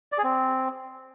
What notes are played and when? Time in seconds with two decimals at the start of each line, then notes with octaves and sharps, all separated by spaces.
0.12 D5
0.18 G#4
0.24 C4